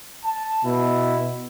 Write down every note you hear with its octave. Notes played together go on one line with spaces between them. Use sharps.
A5
B2 E4